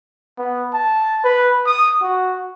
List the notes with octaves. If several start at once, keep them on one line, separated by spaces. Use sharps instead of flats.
B3
A5
B4
D#6
F#4